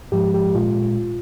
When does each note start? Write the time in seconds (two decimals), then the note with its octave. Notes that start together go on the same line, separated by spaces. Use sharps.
0.12 G#2 F3 G#3 G4
0.34 G4
0.55 A#2 G#3 F4